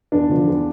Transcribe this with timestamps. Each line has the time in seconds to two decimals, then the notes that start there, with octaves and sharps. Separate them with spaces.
0.12 E2 D4
0.29 D3 F3
0.47 E2